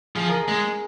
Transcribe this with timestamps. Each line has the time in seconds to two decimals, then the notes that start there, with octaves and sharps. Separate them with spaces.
0.16 F3 G#4
0.29 A#4
0.42 G#4
0.48 G#3